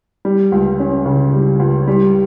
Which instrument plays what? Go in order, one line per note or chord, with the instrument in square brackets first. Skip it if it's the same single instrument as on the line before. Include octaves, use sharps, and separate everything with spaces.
[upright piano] G3
C#2
C#4
C#3
G3
C#2
G3